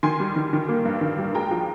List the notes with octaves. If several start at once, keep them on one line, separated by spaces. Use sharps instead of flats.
D#3 G#5 C6
G3
D#3
D#3
A#3
G2
D#3
G3
G#3 G5 A#5
F3